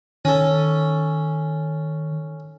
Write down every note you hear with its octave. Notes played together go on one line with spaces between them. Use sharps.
D#3 C#4 A4